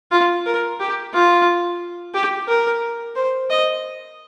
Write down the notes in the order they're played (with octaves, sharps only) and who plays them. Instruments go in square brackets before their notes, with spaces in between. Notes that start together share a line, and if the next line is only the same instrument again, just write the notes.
[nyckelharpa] F4
A#4
G4
F4
G4
A#4
C5
D#5